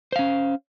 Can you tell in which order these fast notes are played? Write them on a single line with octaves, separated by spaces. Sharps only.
C5 F5 C#4